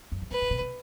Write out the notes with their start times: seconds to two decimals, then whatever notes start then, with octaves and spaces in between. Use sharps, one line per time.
0.12 F#2
0.22 G2
0.31 A2 B4
0.42 A2
0.51 B2
0.61 C3